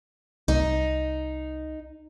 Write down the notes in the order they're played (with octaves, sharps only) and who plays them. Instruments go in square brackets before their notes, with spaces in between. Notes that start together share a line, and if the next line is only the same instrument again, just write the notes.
[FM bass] C2 [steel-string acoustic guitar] D#4